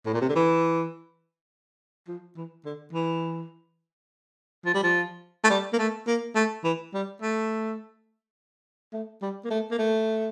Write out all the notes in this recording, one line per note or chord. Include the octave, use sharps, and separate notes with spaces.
A2
A#2
C3
D3
E3
F3
E3
D3
E3
F3
G3
F3
A3
G3
A#3
A3
A#3
A3
E3
G3
A3
A3
G3
A#3
A3
A#3
A3